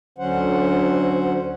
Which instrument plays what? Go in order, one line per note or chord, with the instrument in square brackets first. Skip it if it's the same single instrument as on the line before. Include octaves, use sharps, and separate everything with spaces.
[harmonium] D2 D3 F#3 C#4 C5 F#5